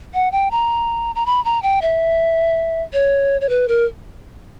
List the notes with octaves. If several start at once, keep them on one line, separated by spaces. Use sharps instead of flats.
F#5
G5
A#5
A#5
B5
A#5
G5
E5
C#5
C#5
B4
A#4